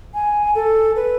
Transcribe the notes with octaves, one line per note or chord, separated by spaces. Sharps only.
G#5
A4
B4